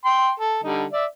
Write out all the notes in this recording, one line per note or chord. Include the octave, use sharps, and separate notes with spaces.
G5 C6
A4
D3 G3 D#4
D5 E5